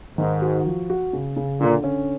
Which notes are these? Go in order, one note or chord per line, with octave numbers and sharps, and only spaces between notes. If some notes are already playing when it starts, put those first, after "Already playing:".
G#2 D#3
F#4
F3
F#4
C#3
C#3
A#2 D3
C#4